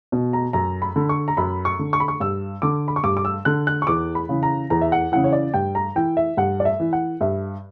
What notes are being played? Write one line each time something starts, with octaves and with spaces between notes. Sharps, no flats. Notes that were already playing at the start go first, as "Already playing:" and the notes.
B2
A#5
F#2 A#5
B5
D3
C#6
A#5
F#2 B5
C#6
D3
C#6
B5
C#6
G2 E6
D3 D6
B5
C#6
G2 D6
D6
E6
D3 F#6
F#6
C#6
E2 D6
B5
C#3 E3
A#5
E2 A#5
E5
F#5
C#3 E3 F#5
C#5
D5
G2 G5
A#5
E3 G5
E5
G2 F#5
D5
E5
E3
F#5
G2 E5